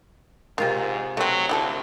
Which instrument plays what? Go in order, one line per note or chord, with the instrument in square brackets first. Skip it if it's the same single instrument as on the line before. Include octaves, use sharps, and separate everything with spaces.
[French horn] G#2 [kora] C3 F4 F5 [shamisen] D#3
[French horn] F#3 [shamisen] A3 C4 [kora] D#5
[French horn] D2 [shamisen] E4 F#4 A4